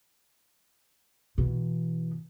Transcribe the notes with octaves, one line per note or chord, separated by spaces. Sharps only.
B2 E3